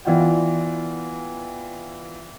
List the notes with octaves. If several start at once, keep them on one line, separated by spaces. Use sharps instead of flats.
E3 B3 F4 D5 F#5 G5